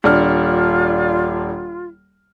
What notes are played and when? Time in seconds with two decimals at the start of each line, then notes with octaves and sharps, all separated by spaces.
0.04 D#1 D4 F4 F6